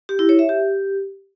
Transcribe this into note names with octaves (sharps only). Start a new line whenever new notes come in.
G4
E4
C#5
E5
G4